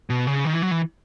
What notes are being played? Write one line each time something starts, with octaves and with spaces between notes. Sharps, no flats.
B2
C#3
D#3
E3
F#3
E3